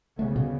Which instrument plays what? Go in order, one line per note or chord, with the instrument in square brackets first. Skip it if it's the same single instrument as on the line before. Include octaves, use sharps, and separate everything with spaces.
[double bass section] D2 C#3 G3 B3 [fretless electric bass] A3
[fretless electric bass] B2